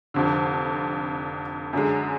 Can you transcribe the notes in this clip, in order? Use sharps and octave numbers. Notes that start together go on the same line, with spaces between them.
F1 F2 D3
F#2 D3 G#3